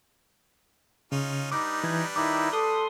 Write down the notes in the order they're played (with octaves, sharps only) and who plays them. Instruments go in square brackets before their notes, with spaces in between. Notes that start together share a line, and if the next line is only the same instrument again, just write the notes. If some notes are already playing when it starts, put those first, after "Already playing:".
[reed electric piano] C#3 [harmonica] C#4 D#4 F4
[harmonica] G3 D4 B4 [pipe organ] D#4 [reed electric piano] D6
[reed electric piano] E3 G#6
[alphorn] D#3 [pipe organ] D#4 E4 [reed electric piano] D6
[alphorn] A4 [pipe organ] C6 D#6